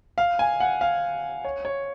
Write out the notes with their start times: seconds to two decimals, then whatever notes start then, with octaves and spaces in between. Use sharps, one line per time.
0.18 F5
0.39 G#5
0.60 F#5
0.81 F5
1.45 C#5
1.65 C#5